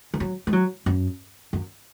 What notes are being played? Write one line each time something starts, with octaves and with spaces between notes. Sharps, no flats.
D#3
F#3
G#3
F#3
F#2
F#2